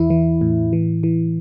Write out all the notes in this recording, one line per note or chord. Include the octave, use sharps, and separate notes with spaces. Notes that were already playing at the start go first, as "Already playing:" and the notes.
Already playing: E2 E3 E4
E3
A2
E3
E3